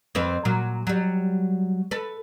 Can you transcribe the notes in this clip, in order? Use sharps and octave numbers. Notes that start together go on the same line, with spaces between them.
F2 C4 B4
A#2 F#3
F#3 G3
A4 B4